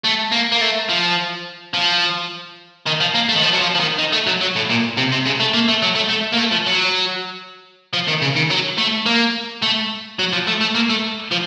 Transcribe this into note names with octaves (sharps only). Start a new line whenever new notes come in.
A3
A#3
A#3
A3
F3
F3
D#3
F3
A#3
A3
D#3
F3
F#3
F3
F3
D#3
D#3
A3
F#3
F#3
A2
A#2
C3
C3
C#3
A3
A#3
A3
F#3
A3
A3
A#3
A3
F3
F#3
F3
D#3
C#3
D#3
F#3
A3
A#3
A3
F#3
F3
A3
A3
A#3
A3
F3